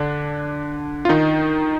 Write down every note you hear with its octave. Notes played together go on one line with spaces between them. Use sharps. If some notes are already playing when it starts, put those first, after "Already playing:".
Already playing: D3 D4
F4
D#3 D#4